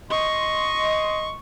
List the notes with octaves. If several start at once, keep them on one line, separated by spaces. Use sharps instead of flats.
D#5 C6 C#6